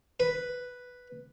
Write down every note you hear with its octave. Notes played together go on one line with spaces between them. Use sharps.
B4